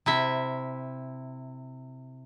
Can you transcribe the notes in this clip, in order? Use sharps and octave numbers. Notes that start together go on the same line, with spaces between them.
C3 E4 E5